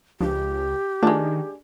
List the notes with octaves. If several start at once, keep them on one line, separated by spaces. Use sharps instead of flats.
C#2 F3 D4 G4
D#3 G#3 A3 D4 F4